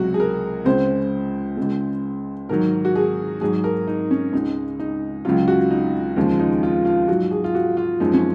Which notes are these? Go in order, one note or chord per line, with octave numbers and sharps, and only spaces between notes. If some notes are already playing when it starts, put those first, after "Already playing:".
Already playing: C#2 C3 F#3 F#4
G#4
A#4
C#2 C#3 G#3 C5
C#2 C#3 G#3
G#2 D#3 F#3 A#4
F#4
G#4
G#2 F#3 G#4
A#4
D#4
C#4
C#2 C#3 G#3 D#4
D#4
C#2 C#3 F#3 F4
F#4
D#4
D#2 C#3 F3 G#3
D#4
F4
F4
G#2 F#3 F#4
G#4
F4
F#4
F4
F#2 F3 G#3 D#4
C#4